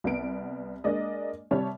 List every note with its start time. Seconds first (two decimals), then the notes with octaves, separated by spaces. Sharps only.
0.04 C2 B3 D7
0.84 G#3 A#3 D4 D5 D#5
1.51 C3 G3 C#5 A5